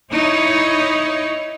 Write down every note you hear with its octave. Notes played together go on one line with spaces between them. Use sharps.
D#4 E4 C#5